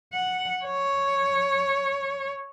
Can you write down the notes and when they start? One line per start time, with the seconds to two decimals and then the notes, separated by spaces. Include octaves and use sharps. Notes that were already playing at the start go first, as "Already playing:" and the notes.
0.14 F#5
0.64 C#5